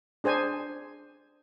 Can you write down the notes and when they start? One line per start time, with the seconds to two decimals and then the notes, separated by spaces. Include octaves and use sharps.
0.24 D4 G#4 C5 G#5